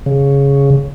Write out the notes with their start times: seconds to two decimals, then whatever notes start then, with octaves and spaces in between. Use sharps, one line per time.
0.06 C#3